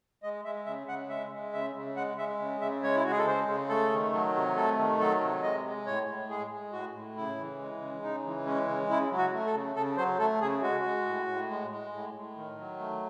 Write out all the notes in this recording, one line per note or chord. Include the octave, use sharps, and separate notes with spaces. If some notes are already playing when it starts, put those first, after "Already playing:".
G#3 D#5
G#3 E5
C#3 E5
C#3 F#5
G#3 E5
G#3
C#3 E5
C#3
G#3 F#5
G#3 E5
C#3
C#3 E5
G#3 C#5
E4
G#3 F#4
G#4
A4
C#3 C5
C#3
A3 A4
D#3
F#3
C3
A3 A4
D#3
F#3 A4
C3
G#3 D#5
G#3
A2 C#5
A2
G#3 G#4
G#3
A2 F#4
A2
C#3 E4
E3
G#3
C#3
C#3 D#4
E3
G#3 C#4
C#3
C#3 E4
F#3
F#4
A3
A4
C#3
C#3 A4
F#3 C5
A3 A4
C#3 G#4
G#3 F#4
G#3
A2
A2
G#3
G#3
A2
A2
D#3
F#3
A3